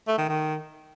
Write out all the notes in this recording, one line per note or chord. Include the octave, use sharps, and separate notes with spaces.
A3
D#3
D#3